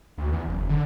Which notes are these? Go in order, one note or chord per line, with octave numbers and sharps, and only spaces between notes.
D2
E2
F#1
D3